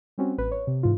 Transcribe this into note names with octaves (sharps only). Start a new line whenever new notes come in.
G3 C4 C#4 F#4
A1 B4
C#5
C3
G#2 E3 F4